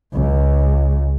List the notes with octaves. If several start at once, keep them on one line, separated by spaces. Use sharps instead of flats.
C#2